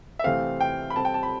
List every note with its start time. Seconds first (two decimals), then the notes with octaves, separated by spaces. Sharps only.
0.19 E5
0.24 C3 E3 A3 C4 F5
0.61 G5
0.90 B5
0.96 C3 G3 C4 A5
1.05 G5
1.14 A5
1.23 B5